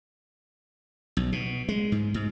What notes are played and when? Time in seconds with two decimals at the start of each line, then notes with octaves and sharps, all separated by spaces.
1.17 B1
1.32 B2
1.69 G#3
1.92 G#2
2.14 G#2